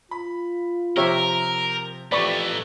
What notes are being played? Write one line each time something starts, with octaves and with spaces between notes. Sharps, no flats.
F4 B5
C3 F3 C4 G4 A#4 C#5 E5
F2 E3 A3 G4 B4 D5 B5 C#6